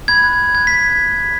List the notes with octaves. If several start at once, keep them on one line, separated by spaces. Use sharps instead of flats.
B5 G#6
F#6
B5
F#6 G#6
B6